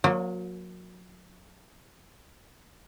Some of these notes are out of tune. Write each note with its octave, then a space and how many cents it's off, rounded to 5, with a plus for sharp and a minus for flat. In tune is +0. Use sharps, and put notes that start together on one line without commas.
F#3 -30 A#3 +0 F#4 -40